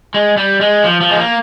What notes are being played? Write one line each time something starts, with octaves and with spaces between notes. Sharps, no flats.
G#3
G3
G#3
F3
F3
G#3
A#3